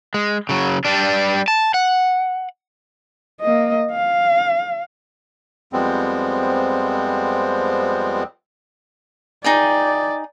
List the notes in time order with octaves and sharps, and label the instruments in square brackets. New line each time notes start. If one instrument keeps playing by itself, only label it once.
[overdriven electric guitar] G#3
C#3 F#3
G3 D4
A5
F#5
[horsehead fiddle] A#3 D#5
F5
[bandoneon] F2 F3 G3 G#3 B3 C4
[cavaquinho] D#4 G#4 G5 [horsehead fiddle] D5